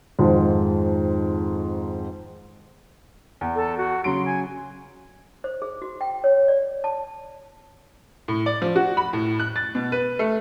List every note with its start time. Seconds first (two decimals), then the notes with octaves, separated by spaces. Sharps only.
0.19 F2 G#2 D#3 F3
3.41 E2
3.55 A4
3.77 F#4
4.04 C#3 F#3 C6 D7
4.25 G#5
5.44 C5
5.62 G#4
5.82 F#4
6.01 G5
6.24 C#5
6.48 D5
6.84 A5
8.28 A2
8.46 D5
8.62 F3
8.76 F#4
8.97 B5
9.13 A2
9.40 F#6
9.56 A6
9.75 B2
9.92 B4
10.19 A3